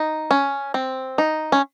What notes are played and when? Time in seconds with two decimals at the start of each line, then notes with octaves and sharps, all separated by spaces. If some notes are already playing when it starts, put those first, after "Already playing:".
Already playing: D#4
0.31 C#4
0.74 C4
1.18 D#4
1.52 C#4